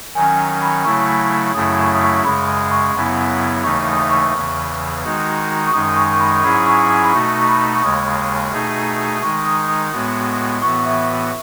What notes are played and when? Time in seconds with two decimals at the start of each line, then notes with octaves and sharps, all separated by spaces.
0.15 D#3 F#3 C#4 G#5
0.62 B5
0.84 C#3 F#3 A3 E4 C#6
1.54 F#2 C#3 F#3 A3 E4 D#6
1.78 C#6
1.94 D#6
2.02 C#6
2.24 F#2 C#3 G#3 B5
2.48 D#6
2.71 C#6
2.94 F#2 C#3 F#3 B3 E4
3.63 D#2 C#3 E3 A3 D#4 C#6
3.87 D#6
4.11 C#6
4.34 E2 C#3 E3
5.03 D#3 G#3 D#4 F#4
5.66 C#6
5.73 F#2 D#3 G#3 D#4 D#6
5.96 C#6
6.13 C#6
6.20 B5
6.36 C#6
6.43 G#2 F#3 C#4 E4 G#4 B5
6.58 D#6
6.66 C#6
6.89 D#6
7.04 B5
7.12 B2 A3 D#4 F#4 C#6
7.41 C#6
7.48 B5
7.75 C#6
7.82 D#2 C#3 G#3 D#6
8.52 B2 A3 D#4 G#4
9.22 D#3 G#3 D#4 C#6
9.46 D#6
9.68 D#6
9.92 A2 G#3 B3 F#4
10.62 A2 E3 B3 F#4 C#6
10.85 E5